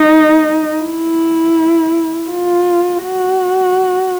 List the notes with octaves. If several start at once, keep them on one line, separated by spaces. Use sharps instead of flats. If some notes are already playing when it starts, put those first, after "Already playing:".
Already playing: D#4
E4
F4
F#4